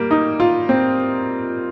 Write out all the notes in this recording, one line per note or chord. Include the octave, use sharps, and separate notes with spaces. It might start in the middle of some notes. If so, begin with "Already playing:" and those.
Already playing: G3 A#3
D#4
F4
C4